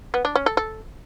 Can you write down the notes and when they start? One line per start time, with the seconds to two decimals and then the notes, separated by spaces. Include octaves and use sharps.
0.14 B3
0.25 D4
0.35 C#4
0.46 A4
0.57 A4